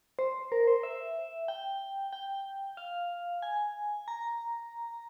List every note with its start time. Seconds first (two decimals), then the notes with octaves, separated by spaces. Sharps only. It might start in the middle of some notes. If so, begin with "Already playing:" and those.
0.19 C5
0.52 A#4
0.67 C5
0.83 E5
1.48 G5
2.13 G5
2.77 F5
3.42 G#5
4.08 A#5